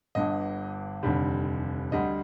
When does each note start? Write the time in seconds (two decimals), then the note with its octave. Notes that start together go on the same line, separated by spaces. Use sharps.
0.15 G1 G2 D3 D#5
1.03 F1 D#2 D3 G3
1.92 D2 D3 G3 D#5